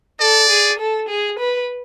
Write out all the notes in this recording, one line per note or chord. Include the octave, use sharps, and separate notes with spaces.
A4 D5
G#4
A4
G#4
B4